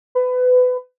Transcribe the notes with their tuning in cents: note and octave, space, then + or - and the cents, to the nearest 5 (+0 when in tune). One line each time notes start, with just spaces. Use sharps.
B4 +25